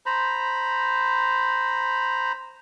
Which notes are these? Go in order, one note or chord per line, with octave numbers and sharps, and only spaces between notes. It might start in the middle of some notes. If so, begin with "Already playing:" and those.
C5 A#5 B5